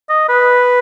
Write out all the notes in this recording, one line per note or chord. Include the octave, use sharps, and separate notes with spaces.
D#5
B4